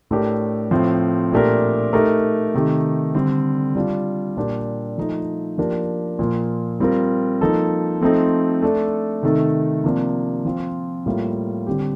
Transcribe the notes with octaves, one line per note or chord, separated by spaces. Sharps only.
A2 A3 D4 G4 A#4
A2 F3 C4
A#2 A3 D4 G4 A#4
A3 D#4 G4 A#4
C3 D#3 A3 D#4 G4
D3 G3 C4
G3 D4 F4
A#2 G3 D4 G4 A#4
F3 A3 D#4 A4
F3 A#3 D4 G4 A#4
A#2 F3 A#3
G3 C4 F4 A#4
F3 A#3 D#4 A4
F3 A3 C4 D#4 A4
A3 D4 A4
C3 D#3 A3 D#4 A4
C3 F3 A#3 D4
F3 C4 F4
A2 G3 A#3 F4
D3 G3 C4 G4